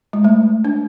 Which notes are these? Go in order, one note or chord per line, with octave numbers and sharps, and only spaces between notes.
G#3
A3
D4